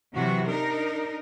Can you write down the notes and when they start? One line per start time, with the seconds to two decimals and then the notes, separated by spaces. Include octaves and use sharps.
0.16 C3 E3 F#3 F#4
0.49 D4 D#4 A#4